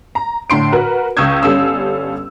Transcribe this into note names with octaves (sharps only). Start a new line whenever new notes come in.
A#5
A2 D3 C6 D7
F#4 A#4 B4
C#2 C#6 D#6 E6 G6 G#6
G1 G3 C#4 A4 F5 E6